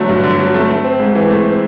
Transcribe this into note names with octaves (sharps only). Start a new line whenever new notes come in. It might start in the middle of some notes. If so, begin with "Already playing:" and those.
Already playing: D3 F#3 A3
G2
D3
F#3
A3
A3
C4
G#2
E3
A3
C4